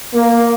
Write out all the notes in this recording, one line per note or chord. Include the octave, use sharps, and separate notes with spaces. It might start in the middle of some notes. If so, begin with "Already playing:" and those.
A#3